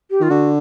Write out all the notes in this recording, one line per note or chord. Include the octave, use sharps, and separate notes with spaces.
G4
D#3 F4
D3 F#4